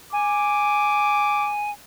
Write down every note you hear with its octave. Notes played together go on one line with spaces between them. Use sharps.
G#5 D6